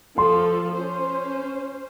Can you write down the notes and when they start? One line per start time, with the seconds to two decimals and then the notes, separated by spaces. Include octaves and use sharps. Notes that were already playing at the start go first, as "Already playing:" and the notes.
0.18 F3 F4 A4 C6
0.76 C#4 C5